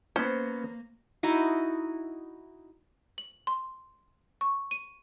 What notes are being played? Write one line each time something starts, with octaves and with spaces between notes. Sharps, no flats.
A#3 B3 C#4 C5
D#4 E4 F#4
F#7
C6
C#6
D#7